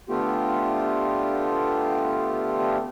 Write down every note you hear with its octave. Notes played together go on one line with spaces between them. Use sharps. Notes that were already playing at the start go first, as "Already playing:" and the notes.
D3 A3 B3 F4 G4